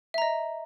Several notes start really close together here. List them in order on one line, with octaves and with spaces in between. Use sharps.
E5 A#5 D#5